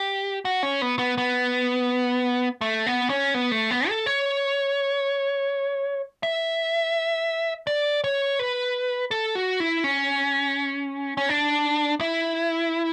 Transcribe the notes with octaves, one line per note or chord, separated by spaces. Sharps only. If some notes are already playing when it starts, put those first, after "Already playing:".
Already playing: G4
F#4
C#4
B3
B3
B3
A3
B3
C#4
B3
A3
B3
A4
C#5
E5
D5
C#5
B4
A4
F#4
E4
C#4
C#4
D4
E4